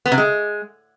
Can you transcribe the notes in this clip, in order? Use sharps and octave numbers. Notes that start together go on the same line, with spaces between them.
B3
C3
G#3